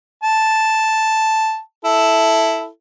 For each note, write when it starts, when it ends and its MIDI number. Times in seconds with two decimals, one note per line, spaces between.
0.24 1.59 81
1.85 2.68 64
1.85 2.68 69